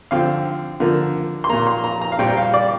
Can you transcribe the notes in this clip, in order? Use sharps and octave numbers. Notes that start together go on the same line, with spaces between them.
D3 F3 C4 F5
D3 F3 A#3
C6
A#2 A#3 A#5
C6
A#5
A#5
F5
A#2 G3 C4 G5
G5
F5
D5